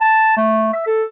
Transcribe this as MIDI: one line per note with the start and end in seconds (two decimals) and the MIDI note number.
0.01 0.32 81
0.37 0.71 57
0.73 0.85 76
0.86 1.03 69